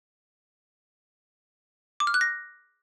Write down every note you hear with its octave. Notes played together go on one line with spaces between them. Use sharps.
D6
F6
F#6
A#6